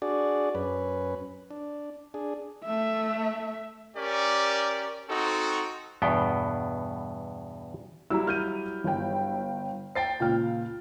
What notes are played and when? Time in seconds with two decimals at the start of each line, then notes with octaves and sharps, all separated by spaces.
0.02 D4 F#4 G#4 D5
0.55 F#2 C#4 B4
1.51 D4
2.14 D4 G#4
2.66 A3 E5
3.97 C#4 G4 A#4 D5
5.09 C4 D#4 F#4 A4
6.02 E2 G2 B2 B3 G5
8.10 F#3 G3 E4 A#5 E6
8.27 F6 G6 D#7
8.84 G1 G5
9.95 C5 G5 A6 C7
10.20 C#2 A#2 G5 F6